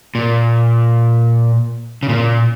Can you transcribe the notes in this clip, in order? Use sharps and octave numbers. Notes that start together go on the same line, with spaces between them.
A#2
C#3
A#2